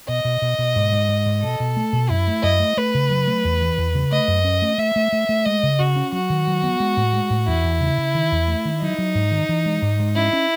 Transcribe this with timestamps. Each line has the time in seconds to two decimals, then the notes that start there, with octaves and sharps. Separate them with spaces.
0.08 B2 D#5
0.25 B2
0.42 B2
0.59 B2
0.76 G#2
0.92 G#2
1.09 G#2
1.26 G#2
1.42 B2 A4
1.60 B2
1.77 A3
1.93 B2
2.09 F#2 E4
2.27 A3
2.43 F#2 D#5
2.60 A3
2.77 A3 B4
2.94 C#3
3.10 F#3
3.27 A3
3.44 E2
3.62 E3
3.78 E2
3.94 C#3
4.11 A3 D#5
4.28 F#2
4.44 C#4
4.62 A3
4.78 A3 E5
4.96 A3
5.13 A3
5.29 A3
5.45 G#3 D#5
5.63 C#3
5.79 C#3 F#4
5.96 C#4
6.12 F#3 F#4
6.30 D#3
6.47 F#3
6.63 B3
6.80 G#3
6.97 A2
7.13 G#3
7.30 A2
7.47 E2 E4
7.64 E2
7.81 C#3
7.98 C#3
8.15 D#3
8.32 E2
8.48 A3
8.65 D#3
8.82 F#3 D#4
8.98 F#3
9.15 G#2
9.31 D#3
9.49 E3
9.66 G#3
9.82 G#2
9.99 G#2
10.16 C#4 E4
10.33 C#4